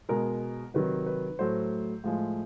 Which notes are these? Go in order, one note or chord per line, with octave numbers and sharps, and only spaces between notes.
B2 G#3 A#4
C3 D#3 F#3 B4
B4
A2 F#3 A3 C5
A2 F3 G#3